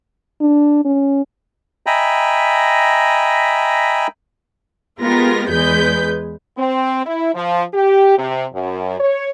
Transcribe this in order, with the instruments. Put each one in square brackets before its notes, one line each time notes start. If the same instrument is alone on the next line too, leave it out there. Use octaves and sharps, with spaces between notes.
[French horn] D4
C#4
[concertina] D#5 E5 G5 G#5 A#5 B5
[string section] G#3 B3 F4 G4 A#4 A#6
E2 G#3 G#4 B4 G6 B6
[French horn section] C4
E4
F3
G4
C3
F#2
C#5